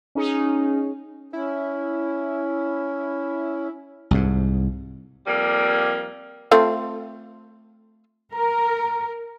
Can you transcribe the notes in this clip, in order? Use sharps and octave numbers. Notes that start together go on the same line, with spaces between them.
C#4 D#4 G#4
C#4 E4
C2 G#2
F2 G3 A#3
A3 C4 F4
A#4 A#5